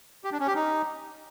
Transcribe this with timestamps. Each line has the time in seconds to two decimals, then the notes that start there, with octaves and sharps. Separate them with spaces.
0.24 G4
0.32 D4
0.40 C#4
0.47 G4
0.55 D#4